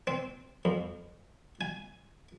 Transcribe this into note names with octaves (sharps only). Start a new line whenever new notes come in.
C4
F2
G#5